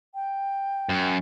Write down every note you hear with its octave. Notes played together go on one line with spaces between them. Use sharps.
G5
F#2